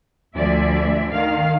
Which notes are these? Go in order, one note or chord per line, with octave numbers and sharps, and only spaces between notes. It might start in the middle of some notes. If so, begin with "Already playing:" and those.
D2 F3 D5 E5
D#3 F5